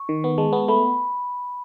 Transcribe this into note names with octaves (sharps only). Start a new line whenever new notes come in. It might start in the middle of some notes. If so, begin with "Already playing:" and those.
Already playing: C#6
D#3
B3
G#3 A5
B3
A3 B5